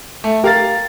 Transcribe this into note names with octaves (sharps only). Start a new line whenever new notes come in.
A3
G4 A#4 F5 A6